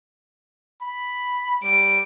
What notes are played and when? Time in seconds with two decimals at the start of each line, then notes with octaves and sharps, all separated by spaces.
0.82 B5
1.64 G3 D7